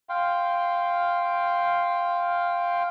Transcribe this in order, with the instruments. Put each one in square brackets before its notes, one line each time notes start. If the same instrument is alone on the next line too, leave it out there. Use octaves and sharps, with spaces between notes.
[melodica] F5 G5 C6